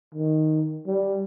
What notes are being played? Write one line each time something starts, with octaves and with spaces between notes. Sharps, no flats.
D#3
G3